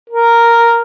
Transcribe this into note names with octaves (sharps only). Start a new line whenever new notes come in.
A#4